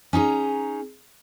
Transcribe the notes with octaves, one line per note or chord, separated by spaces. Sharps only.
C#4 D#4 G#4 A#5